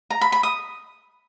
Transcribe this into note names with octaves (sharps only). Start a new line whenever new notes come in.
A#5
B5
B5
D#6